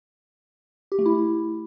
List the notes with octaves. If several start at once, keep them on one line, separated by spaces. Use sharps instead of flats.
G4
A3
E4